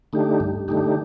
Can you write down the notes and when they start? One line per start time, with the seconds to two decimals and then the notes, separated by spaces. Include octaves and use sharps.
0.13 D3 A3 D#4 G4
0.40 G2
0.68 D3 A3 D#4 G4